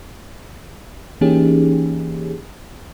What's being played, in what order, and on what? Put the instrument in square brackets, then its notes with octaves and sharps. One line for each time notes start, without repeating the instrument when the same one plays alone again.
[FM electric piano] E3 A#3 C#4 D#4 G4 G#4